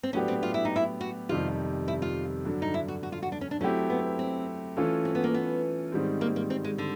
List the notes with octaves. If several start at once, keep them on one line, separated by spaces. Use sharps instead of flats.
C4
A2 F#3 B3 C#4 D4 G4
C4
F4
E4
D#4
E4
F#4
F2 C3 D#3 G3 F4
E4
F4
G2 D3 F#3
D#4
E4
F#4
F#4
F4
F#4
D4
C#4
D4
F#3 A3 C4 C#4 E4 G4
B3
C4
E3 A3 C#4 F4 A4
C4
B3
A#3
B3
G#2 D#3 G3 C4
A#3
A#3
C4
G#3
D3